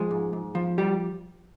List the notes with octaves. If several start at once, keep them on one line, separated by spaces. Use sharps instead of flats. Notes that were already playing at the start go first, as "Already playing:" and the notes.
Already playing: F3 G#3 G#4
G#2
G#2
F3
G3 G4